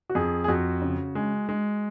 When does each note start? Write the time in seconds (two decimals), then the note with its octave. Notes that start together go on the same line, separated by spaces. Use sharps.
0.10 F#4
0.15 F2 G#4
0.44 G#4
0.48 F2 F#4
0.82 C#3
1.15 G#3
1.49 G#3